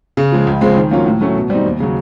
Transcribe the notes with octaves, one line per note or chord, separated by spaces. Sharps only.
C#3
F3 G#3
C#2
C#3 F3 G#3 C4
D#3
F#3 A#3 C#4 F4
A2
F#3 A3 C#4
B2
G3 C4 D#4
D#2
C#3 F#3